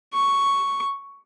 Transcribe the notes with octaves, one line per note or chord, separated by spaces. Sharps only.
C#6